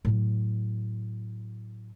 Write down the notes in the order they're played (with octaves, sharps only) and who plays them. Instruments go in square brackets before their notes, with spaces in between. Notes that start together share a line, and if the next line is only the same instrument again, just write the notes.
[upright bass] A2 F#3